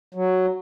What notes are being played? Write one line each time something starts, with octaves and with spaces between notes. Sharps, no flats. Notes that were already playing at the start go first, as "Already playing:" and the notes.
F#3